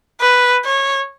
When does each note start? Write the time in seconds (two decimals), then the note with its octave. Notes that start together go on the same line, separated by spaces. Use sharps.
0.21 B4
0.65 C#5